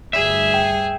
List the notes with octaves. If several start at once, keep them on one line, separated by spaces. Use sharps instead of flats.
D2 G2 G3 G#4 E5
G5